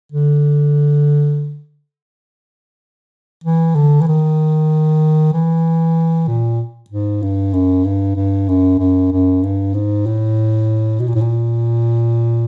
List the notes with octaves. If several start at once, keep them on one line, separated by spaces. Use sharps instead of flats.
D3
E3
D3
E3
D#3
E3
A#2
G#2
G2
F#2
G2
G2
F#2
F#2
F#2
G2
G#2
A2
B2
A#2
A2
A#2